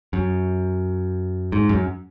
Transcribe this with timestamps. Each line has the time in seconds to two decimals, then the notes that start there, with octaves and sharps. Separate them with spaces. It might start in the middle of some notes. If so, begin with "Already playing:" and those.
0.13 F#2
1.52 G#2
1.69 F#2